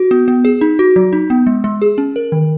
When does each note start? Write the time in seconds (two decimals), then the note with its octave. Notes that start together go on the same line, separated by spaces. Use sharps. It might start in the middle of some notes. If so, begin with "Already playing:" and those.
Already playing: F#4
0.11 B3
0.28 B3
0.45 G#4
0.61 D#4
0.79 F#4
0.96 F#3
1.13 D#4
1.30 B3
1.47 G#3
1.64 G#3
1.82 G#4
1.98 C#4
2.16 A#4
2.32 D#3